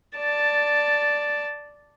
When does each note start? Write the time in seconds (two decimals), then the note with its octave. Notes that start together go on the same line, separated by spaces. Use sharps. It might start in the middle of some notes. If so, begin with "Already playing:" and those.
0.16 D5 A5